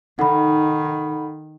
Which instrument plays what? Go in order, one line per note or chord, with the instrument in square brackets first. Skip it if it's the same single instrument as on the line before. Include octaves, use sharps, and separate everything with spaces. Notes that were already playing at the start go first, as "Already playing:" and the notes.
[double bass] D#3 [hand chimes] D#4 A4 [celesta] F#5 B5